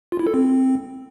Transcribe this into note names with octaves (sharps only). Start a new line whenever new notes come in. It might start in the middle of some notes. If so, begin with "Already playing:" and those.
F4
E4
A4
C4